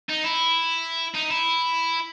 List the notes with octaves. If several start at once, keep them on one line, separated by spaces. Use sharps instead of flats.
D#4
E4
D#4
E4